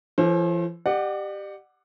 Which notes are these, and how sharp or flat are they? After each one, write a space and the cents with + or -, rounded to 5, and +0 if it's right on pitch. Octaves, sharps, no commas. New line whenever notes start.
F3 -45 A4 +0 C5 +40
G4 +0 D5 +40 F#5 +0